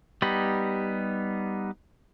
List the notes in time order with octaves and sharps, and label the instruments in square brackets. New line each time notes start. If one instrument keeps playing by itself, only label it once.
[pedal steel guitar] G3 B3 D#4 G4 B5